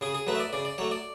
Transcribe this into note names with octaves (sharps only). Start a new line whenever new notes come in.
C#3 G#4
G#4
F#3 A3 B4
E5
D5
C#3 D5
D5
F#3 A3 C#5
D5